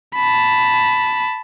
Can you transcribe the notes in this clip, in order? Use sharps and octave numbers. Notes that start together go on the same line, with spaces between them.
A5 B5